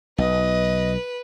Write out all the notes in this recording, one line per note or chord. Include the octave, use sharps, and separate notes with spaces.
B1 B4 D#5